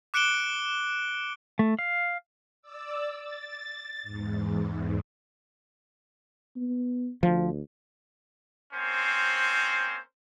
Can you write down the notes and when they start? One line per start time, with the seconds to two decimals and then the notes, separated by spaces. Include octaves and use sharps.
0.14 D6 F#6 C#7 D7 E7 G7
1.59 A3
1.79 F5
2.62 D5 D6 E6
3.14 A6
4.03 E2 G#2
6.57 B3
7.23 D2 F3
8.73 A#3 C4 C#4 C5